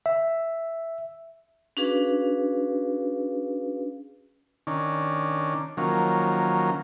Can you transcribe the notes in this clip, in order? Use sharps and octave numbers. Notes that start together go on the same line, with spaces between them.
E5
C#4 D4 F#4 G#4 B4 F5
D#3 C#4 D4
D#3 F3 F#3 A#3 C#4